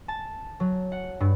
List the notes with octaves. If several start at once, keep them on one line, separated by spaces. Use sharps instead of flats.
A5
F#3
F#5
G2